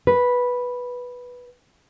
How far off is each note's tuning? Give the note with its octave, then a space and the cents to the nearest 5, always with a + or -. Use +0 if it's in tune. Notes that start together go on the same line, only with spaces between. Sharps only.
B4 -5